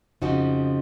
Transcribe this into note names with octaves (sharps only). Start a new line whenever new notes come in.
F2 C#3 F3 D#4 F#4